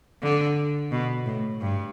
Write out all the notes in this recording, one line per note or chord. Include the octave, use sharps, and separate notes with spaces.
D3
B2
A2
G2